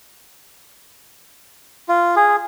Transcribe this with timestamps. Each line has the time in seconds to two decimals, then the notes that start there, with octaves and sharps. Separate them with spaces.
1.89 F4
2.16 G#4